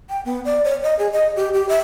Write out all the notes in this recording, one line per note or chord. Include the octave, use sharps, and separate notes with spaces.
G5
B3
D5
C#5
D#5
G#4
D#5
G4
G4
E5